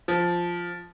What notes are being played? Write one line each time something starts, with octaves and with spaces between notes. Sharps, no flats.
F3